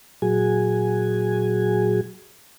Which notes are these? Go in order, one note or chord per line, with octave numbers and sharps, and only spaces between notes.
A#2 F#3 F#4 G#4 G#5